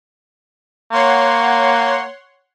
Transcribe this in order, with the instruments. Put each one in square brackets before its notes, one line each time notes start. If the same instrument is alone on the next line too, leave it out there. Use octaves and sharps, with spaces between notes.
[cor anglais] A#3 [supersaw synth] C#5 F#5 C6